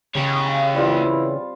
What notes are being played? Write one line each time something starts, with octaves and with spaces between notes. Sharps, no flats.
C#3 G4 C#5
E3 G3 C4 F4